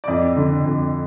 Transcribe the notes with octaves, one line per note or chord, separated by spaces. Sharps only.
D5
F2 D#5
D3
F2